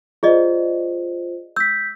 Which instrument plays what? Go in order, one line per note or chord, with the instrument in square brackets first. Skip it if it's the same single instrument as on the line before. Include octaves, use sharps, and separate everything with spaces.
[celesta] F4 C5 [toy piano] G#4 D5 D#5
[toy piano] E6 [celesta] G6 B6